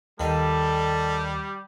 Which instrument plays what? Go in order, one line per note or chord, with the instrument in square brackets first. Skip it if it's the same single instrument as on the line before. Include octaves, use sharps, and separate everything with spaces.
[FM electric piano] D#2 [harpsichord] D#3 F5 [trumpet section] G3 [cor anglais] A4